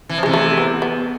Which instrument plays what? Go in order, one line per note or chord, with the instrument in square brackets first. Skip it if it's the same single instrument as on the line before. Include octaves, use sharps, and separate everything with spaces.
[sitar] E3
F3
[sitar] C3 E3 [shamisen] G#3
[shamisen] A3
B3
B3